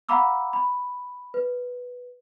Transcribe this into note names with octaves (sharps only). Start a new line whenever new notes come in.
F5 F#5 A#5 B5 D6 E6
B5
B4